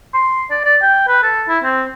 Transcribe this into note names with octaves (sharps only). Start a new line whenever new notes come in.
C6
D5
D5
G5
B4
A4
E4
C4